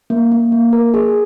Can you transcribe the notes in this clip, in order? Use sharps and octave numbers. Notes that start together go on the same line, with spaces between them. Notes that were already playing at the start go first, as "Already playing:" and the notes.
A#3
A#3
A#3
A#4
G#4